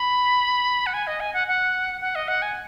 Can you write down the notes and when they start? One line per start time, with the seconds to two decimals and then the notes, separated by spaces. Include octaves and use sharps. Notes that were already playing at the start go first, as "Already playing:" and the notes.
Already playing: B5
0.86 F#5
0.94 G#5
1.07 D#5
1.20 G#5
1.34 F#5
1.48 F#5
2.01 F#5
2.15 D#5
2.28 F#5
2.42 G#5